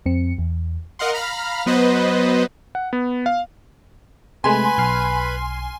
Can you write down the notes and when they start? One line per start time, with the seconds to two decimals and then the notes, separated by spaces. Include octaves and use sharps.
0.06 F2 C4 C#7
0.38 E2
0.99 A#4 D#5 F5 F#5 C6
1.13 F5 A#5 B5 F6
1.66 F#3 B3 B4 C5 D#5
2.75 F#5
2.93 B3
3.26 F5
4.44 C3 G#3 A3 B4 G#5 B5 C6
4.78 B1 F6 C7